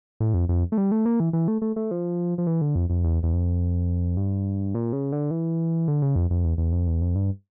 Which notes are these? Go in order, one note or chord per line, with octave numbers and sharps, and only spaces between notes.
A2
F2
F2
A3
G3
A3
A#3
E3
E3
A3
A3
A3
F3
F3
E3
D3
F2
F2
E2
E2
F2
G2
A#2
C#3
D3
E3
D3
C#3
F2
F2
E2
E2
F2
E2
F2
G2